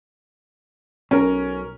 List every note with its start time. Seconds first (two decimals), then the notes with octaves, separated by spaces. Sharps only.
1.11 B1 C#4 A#4